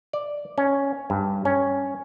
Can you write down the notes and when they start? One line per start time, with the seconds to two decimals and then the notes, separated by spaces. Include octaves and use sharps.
0.13 D5
0.58 C#4
1.10 G2
1.45 C#4